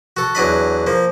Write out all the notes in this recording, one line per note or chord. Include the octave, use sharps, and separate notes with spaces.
F#4 A4
E2 F#3 D4 D#5 B5
F3 A#3